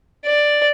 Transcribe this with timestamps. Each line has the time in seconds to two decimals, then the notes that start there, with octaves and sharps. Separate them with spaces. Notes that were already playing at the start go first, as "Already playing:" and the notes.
0.25 D5